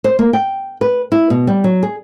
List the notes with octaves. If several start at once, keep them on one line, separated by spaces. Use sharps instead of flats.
C5
A#3
G5
B4
E4
B2
G3
F#3
G#4